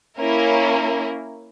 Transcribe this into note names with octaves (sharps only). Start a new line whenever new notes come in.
A#3 C#4 E4 A#4